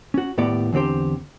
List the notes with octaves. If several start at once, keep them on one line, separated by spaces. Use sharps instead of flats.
C#4 F#4
D#2 A2 B3 F#4 G4 D5
E2 D3 C4 G4 C5